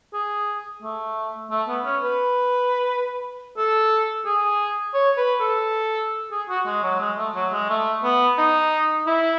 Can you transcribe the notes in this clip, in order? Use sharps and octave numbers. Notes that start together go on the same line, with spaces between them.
G#4
A3
A3
B3
C#4
B4
A4
G#4
C#5
B4
A4
G#4
F#4
G#3
F#3
G#3
A3
F#3
G#3
A3
B3
D#4
E4